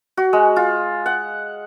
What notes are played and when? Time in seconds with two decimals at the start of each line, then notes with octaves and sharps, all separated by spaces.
0.17 F#4
0.33 G#3
0.56 F4
1.06 F#5